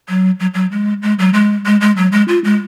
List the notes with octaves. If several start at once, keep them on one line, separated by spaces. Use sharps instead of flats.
F#3
F#3
F#3
G#3
G#3
F#3
G#3
G#3
G#3
F#3
G#3
F4
G#3